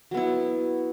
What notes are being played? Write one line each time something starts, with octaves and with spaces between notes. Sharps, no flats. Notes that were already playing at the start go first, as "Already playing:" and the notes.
F#3 B3 E4